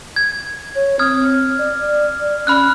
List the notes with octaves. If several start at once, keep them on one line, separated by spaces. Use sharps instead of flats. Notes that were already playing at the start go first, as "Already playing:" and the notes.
G#6
C#5
C4 D#6 F6 G#6
D5
C#4 B5 F6 F#6